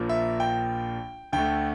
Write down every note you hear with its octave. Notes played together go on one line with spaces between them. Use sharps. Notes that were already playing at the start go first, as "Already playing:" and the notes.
Already playing: A#1 A#2 F3 A#3
E5
G5
D2 D3 A3 G5